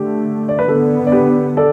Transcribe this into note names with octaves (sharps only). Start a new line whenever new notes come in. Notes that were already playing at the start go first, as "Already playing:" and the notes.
Already playing: D3 A3 G4
D5
B4
D3 B3 A4
D5
G4 B4
A4 D5